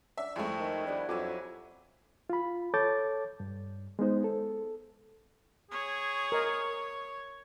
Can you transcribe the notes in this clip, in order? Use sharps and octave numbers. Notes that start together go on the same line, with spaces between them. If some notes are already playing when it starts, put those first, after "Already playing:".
D4 E5
F2 G#3 A3 E4 G#4 C#6
D#3
G3 B3 D4 F#5
F2 F#3 E5 G#5 D6
F4 B5
A4 C#5 A5 D6 G6 A6
G2
G#3 B3 D#4 C5
A4
G#4 C#5
A#4 D#5